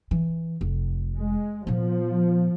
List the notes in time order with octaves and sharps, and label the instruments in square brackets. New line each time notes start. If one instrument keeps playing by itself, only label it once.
[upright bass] E3
F1
[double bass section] G#3
[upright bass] A#2 B3 [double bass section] F3